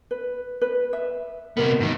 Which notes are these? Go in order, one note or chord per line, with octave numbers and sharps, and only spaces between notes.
B4
B4
E5
C3 B3 A#4
G#2 D#3